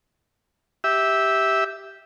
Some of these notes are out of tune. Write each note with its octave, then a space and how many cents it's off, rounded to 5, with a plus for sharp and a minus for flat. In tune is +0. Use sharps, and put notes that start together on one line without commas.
G4 +0 E5 -10